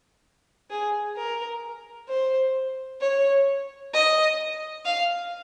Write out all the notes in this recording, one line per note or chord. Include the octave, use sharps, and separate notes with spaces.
G#4
A#4
C5
C#5
D#5
F5